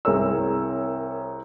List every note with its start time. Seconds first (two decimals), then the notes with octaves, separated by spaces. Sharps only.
0.05 C2 G#4 A#4 C#5 E6